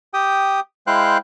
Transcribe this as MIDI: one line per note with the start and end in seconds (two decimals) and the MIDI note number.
0.14 0.60 67
0.14 0.60 79
0.14 0.60 87
0.87 1.18 56
0.87 1.18 64
0.87 1.18 72
0.87 1.18 77
0.87 1.18 79
0.87 1.18 90